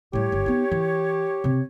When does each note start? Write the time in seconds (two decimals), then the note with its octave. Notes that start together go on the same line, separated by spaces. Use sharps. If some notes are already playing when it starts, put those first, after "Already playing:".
0.13 A2 G3 G4 C#5
0.32 G1
0.46 B3 D#4
0.72 E3
1.44 C3